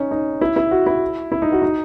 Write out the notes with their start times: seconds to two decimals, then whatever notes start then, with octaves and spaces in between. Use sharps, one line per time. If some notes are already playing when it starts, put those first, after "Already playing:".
Already playing: C#4 D#4
0.11 D#4
0.41 E4
0.56 E4
0.71 F#4
0.86 E4
1.32 E4
1.42 D#4
1.52 F#4
1.62 D#4